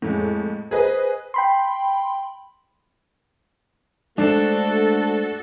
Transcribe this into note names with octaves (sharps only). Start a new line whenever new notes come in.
F2 A2 G#3
G#4 B4 C5 D#5
G5 B5 C6
G#3 A3 D4 F#4 A4 C5 A5